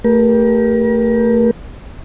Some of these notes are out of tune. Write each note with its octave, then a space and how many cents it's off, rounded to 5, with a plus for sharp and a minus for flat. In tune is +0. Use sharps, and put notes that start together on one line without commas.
A3 +25 G4 +10 A#4 +40